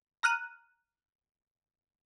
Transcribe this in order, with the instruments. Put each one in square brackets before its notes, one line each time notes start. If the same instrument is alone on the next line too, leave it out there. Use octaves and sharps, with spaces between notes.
[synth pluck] A#5 F6 F#6 D#7